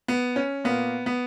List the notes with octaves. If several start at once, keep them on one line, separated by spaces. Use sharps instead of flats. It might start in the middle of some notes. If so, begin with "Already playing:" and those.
B3
C#4
A#2 A#3 B3
B3